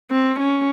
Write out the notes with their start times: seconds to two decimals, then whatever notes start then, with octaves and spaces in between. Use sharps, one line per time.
0.11 C4
0.39 C#4